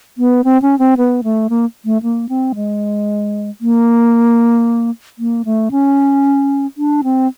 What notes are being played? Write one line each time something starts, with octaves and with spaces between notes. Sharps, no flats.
B3
C4
C#4
C4
B3
A3
A#3
A3
A#3
C4
G#3
A#3
A#3
A3
C#4
D4
C4